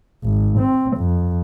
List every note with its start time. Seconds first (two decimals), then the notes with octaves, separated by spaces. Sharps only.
0.23 G#1
0.59 C4
0.97 F2